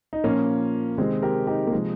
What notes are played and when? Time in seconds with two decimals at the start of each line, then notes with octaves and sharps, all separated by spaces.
0.13 D#4
0.24 A#2 F3 A#3 C#4
0.98 C3 D#3 G#3 C4
1.22 G4 A#4
1.47 D#4 G4
1.67 A#3
1.73 C3 F3 G#3